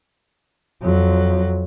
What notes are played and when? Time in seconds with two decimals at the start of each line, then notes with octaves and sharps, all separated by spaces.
0.82 F2 F#3